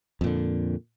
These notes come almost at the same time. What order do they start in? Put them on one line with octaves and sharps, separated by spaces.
F2 A#2 D3